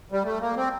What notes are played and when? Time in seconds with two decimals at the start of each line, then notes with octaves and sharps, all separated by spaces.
0.12 G3
0.24 A3
0.40 A#3
0.56 C4